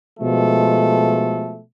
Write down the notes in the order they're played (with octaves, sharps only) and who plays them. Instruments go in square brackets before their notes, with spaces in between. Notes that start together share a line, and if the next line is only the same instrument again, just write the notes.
[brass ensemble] B2 F3 G#3 A3 A4